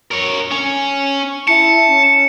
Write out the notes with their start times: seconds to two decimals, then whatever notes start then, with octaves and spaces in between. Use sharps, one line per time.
0.11 A#4 C#5
0.51 C#4
1.48 E4 A5 C#7
1.88 C#4